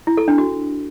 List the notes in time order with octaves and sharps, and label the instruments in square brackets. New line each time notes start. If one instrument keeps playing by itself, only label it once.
[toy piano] E4
A4
D4
F#4